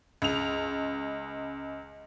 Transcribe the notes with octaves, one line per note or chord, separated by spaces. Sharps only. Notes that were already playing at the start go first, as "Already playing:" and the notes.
C#2 F7